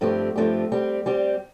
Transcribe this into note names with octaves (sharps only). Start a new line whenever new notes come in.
G2 F3 A3 C4 G4
G2 F3 A3 C4 G4
G3 C4 G4
G3 C4 G4